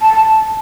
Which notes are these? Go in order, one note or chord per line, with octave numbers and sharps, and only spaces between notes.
A5